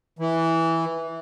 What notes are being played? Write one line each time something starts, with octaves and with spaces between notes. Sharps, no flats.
E3